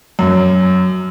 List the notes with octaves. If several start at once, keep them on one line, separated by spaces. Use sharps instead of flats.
F#2